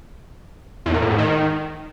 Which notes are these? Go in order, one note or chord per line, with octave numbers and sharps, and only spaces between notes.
E2
A#2
A2
G#2
D#3